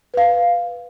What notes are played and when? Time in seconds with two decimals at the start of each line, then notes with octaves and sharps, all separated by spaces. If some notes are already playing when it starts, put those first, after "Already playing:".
0.14 B4 F5